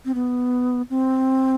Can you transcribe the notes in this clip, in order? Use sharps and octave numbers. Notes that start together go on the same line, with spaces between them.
C4
B3
C4